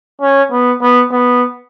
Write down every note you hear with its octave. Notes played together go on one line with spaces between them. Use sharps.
C#4
B3
B3
B3